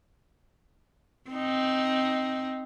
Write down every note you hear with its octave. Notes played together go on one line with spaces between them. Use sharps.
C4 D#4